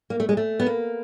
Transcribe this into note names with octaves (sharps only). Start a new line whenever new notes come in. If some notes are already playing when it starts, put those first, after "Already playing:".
A#3
A3
G#3
A3
B3
A#3